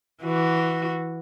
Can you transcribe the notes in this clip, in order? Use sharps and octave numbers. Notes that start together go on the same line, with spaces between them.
E3 F#4